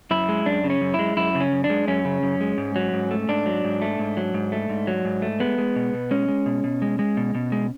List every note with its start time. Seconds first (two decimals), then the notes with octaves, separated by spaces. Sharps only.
0.11 F#2 E4
0.29 G#3
0.46 F#2 D4
0.64 C#3
0.70 C#4
0.81 F#2
0.94 G#3 E4
1.17 F#2 E4
1.35 C#3
1.40 C#4
1.52 F#2
1.64 D4
1.70 G#3
1.87 F#2 C#4
2.05 C#3
2.23 F#2
2.41 G#3
2.58 G#2
2.76 F#3
2.93 G#2
3.11 A3
3.28 G#2 D4
3.46 F#3
3.64 G#2
3.82 A3
3.99 G#2
4.17 F#3
4.34 G#2
4.52 A3
4.69 G#2
4.87 F#3
5.05 G#2
5.22 A3
5.40 G#3 B3
5.58 G#3
5.76 B2
5.94 B2
6.11 G#3 C#4
6.28 G#3
6.46 B2
6.64 B2
6.82 G#3
6.99 G#3
7.17 B2
7.35 B2
7.52 G#3